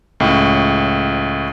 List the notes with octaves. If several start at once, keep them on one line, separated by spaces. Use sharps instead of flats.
C#2 A2 C#4